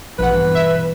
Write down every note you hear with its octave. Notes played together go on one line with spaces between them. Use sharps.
A#1 G2 B2 E3 B4 F#5
E5